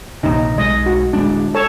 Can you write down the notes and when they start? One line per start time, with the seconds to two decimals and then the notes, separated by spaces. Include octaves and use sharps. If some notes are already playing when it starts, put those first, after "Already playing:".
0.23 A#1 D#2 C3 D#4
0.58 B1 G#3 D#5
0.86 F#4
1.13 D1 G#3 D4
1.55 A4 C#5 A5